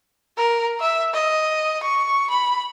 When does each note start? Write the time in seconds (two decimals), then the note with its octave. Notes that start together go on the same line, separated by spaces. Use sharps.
0.37 A#4
0.80 E5
1.14 D#5
1.83 C#6
2.30 B5